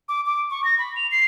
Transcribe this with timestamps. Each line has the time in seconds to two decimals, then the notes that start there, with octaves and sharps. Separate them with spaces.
0.08 D6
0.26 D6
0.50 C#6
0.64 A#6
0.78 B5
0.96 F7
1.11 C7